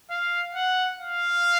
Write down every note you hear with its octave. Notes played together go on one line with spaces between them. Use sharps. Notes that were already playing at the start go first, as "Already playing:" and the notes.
F5
F#5
F5